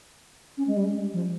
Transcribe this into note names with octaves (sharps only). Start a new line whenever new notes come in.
C#4
G#3
G3
F3